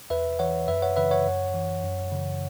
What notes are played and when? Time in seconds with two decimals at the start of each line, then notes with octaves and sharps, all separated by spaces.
0.10 E2 B4 E5
0.39 E3 C#5 F#5
0.68 F#2 B4 E5
0.82 C#5 F#5
0.96 C#3 E3 B4 E5
1.11 C#5 F#5
1.26 F#2
1.54 E3
1.83 F#2
2.12 C#3 E3